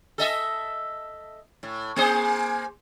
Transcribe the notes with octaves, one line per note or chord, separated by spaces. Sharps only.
A4 D#5 E5
A2
A#3 G#4 C5